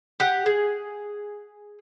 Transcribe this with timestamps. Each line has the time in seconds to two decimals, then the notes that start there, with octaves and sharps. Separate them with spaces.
0.20 G4 F#5
0.46 G#4